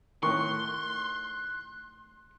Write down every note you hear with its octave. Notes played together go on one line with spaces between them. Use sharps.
A2 D#3 C6 C#6 F#6